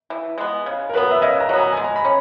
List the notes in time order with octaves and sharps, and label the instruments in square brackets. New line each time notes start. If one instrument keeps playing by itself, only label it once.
[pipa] E3
G#3 B3
C#3
[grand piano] A#4
[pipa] F#3 B3 [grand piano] B4
[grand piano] E5
[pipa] C#3 [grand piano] D#5
[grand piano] A#5
[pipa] F#3 B3
[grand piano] G#5
[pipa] G#3 [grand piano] G#5
[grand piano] A#5
B5
[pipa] C#4